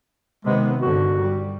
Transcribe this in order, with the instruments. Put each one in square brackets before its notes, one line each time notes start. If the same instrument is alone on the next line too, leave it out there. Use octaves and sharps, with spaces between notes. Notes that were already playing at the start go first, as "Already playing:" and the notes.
[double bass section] C3 D#3 B3 [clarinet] G#3
[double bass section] G1 D3 [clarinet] F#4
[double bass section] G3